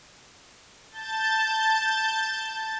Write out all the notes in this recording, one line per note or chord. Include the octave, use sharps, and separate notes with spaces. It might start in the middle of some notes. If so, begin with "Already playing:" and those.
A5 G6 A6